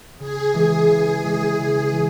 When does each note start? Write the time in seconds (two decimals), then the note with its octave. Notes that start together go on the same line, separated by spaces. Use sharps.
0.20 C#3 G#4
0.54 E3 G#3
0.89 C#3
1.24 E3 G#3
1.58 C#3 G#4
1.93 E3